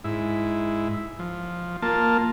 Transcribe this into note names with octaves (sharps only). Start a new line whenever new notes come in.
G#2 E4
F3
A#3 F4 A5